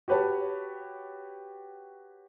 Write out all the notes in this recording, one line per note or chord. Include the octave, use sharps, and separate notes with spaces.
F#4 G4 B4 C#5 A5